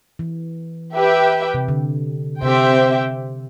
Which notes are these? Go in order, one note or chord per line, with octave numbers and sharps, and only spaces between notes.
E3
G4 B4 E5 G5
C3
D3
C3 C4 G4 C5 E5 G5